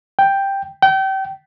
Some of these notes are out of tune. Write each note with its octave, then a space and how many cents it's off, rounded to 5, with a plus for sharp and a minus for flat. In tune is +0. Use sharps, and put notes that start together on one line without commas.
G5 +5
G5 -30